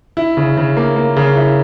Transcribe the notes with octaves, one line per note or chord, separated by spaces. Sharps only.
E4
C#3
C#3
A#3
A#3
C#3
E4